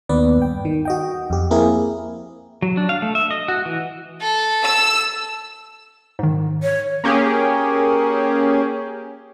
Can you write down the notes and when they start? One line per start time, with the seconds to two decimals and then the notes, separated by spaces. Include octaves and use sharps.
0.09 D#2 B3 B4 D5
0.38 G2 G5
0.65 D#3
0.85 F#4 D#5 G5
1.30 F2 G4
1.51 A#3 C4 E4 G#4 A#4
2.62 F#3
2.77 D4
2.89 F5
3.02 A3
3.15 E5
3.31 D#5
3.48 F#4
3.65 E3
4.21 A4
4.64 E6
6.19 G#2 D#3
6.63 C#5
7.04 A#3 C#4 G4 G#4